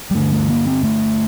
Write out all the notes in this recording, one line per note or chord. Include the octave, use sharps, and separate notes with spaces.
G3
G2 D3 A3
A3
A#3
C4
A3